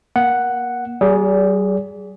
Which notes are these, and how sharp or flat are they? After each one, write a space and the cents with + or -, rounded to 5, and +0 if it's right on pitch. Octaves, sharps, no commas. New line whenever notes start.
A#3 +25 F#5 +0
G3 -40 G#4 +0 D5 -30